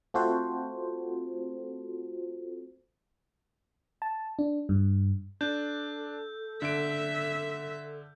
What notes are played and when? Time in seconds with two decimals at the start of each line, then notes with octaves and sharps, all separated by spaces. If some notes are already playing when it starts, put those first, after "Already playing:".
0.14 A3 C4 F4 F#4 A4 C5
4.02 A5
4.39 D4
4.69 G2
5.41 D4 A4 G6
6.62 D3 E5 D7